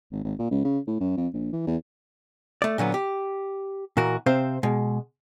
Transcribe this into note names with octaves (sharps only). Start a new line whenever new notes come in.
G#1
G#1
A#2
C#2
C#3
A2
F#2
F2
A#1
E3
E2
A3 D5
A#2 D3 F#3 B3
G4
A#2 E3 F#4 A#4
C3 C4 C5 F5
B2 G#3